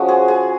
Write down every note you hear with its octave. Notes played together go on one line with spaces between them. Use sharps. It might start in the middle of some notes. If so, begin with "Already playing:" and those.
Already playing: F3 G#3 C#4 F#4
G#4
G#4